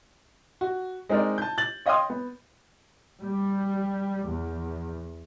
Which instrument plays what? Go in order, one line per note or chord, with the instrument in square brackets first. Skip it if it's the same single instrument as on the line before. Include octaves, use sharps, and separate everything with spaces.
[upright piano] F#4
G#3 C4 D#4 A#4 D5
A5 G6
A6 F#7
C#5 D#5 F5 G5 C6 D#6
B3
[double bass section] G3
E2